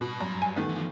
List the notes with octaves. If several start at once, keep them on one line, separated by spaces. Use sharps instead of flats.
G2 B2 B5
F#2
G#5
D#3 A3 B3
E3 F3